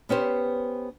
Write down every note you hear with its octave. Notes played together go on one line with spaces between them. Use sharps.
B3 C#4 G4 C5